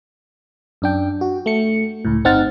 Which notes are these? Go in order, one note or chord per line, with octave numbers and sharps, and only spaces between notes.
F#2 D4 G5
F#4
A3 C#7
C#2 A2
G1 C4 D#4 F#5 F6 A6